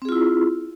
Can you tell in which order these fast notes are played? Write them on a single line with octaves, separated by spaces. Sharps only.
C4 G#4 F4 E4